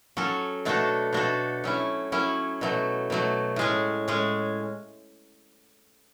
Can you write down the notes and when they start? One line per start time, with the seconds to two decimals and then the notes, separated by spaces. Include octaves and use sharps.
0.17 F#3 C#4 F#4 A4
0.65 B2 A3 D4 F#4 A4
1.13 B2 A3 D4 F#4 A4
1.64 F#3 C#4 E4
2.12 F#3 C#4 E4
2.61 B2 F#3 A3
3.10 B2 F#3 A3
3.56 A2 G#3 C#4 G#4
4.08 A2 G#3 C#4 G#4